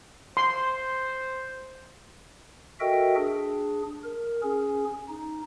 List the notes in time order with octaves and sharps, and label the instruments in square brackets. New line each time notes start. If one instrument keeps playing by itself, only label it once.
[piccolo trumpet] C5 [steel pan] C6
[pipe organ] F#4 A4 A#4 D#5 E5 G5
D4 G#4
A#4
C#4 G#4
D#4